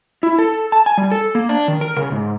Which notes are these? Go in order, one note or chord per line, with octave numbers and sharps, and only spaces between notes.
E4
A4
A5
G#5
G3
A4
A#3
D4
D#3
A#4
C#3
G#2